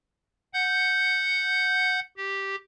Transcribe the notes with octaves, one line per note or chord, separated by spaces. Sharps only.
F#5 G6
G4